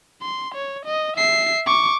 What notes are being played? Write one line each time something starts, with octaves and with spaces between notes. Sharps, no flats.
C6
C#5
D#5
E5 C7
C#6 D6